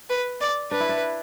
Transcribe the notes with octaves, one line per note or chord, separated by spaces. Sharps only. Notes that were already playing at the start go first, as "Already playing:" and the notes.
B4
D5
D4 B4
E4
D4